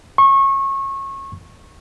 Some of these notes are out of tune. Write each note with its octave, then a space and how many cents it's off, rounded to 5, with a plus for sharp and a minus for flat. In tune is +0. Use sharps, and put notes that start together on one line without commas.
C#6 -25